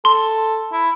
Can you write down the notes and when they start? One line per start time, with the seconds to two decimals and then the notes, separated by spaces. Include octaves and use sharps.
0.05 A4 C6
0.72 E4